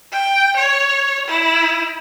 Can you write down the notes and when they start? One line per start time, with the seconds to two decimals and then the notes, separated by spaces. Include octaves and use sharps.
0.12 G5
0.56 C#5
1.28 E4